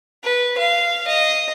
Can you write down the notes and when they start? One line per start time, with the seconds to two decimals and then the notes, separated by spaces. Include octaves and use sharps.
0.23 B4
0.57 F5
1.07 D#5